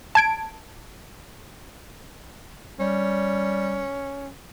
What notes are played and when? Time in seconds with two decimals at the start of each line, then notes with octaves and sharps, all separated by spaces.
0.15 A5 G#6 D7
2.80 G3 C#4